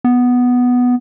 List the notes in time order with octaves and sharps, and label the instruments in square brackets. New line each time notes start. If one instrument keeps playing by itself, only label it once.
[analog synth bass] B3